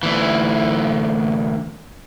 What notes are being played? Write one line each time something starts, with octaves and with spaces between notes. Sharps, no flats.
D2 E3